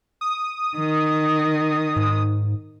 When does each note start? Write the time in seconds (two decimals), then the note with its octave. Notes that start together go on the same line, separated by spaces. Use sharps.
0.21 D#6
0.78 D#3
1.96 G#2